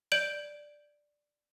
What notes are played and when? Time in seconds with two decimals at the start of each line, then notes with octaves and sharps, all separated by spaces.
0.12 D5 G6 D7 F#7